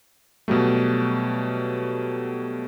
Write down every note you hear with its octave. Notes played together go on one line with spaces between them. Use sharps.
B2 F#3 G3 A3